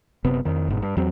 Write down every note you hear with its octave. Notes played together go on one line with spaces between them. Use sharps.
F#1 C3 B3
F2 D#3
G1 G#2 B2
G2
E2 F#3 C4